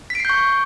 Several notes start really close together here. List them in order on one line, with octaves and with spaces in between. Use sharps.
B6 D7 C7 G6 C#6